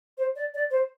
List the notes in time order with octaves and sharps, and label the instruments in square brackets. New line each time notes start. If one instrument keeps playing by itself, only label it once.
[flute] C5
D5
D5
C5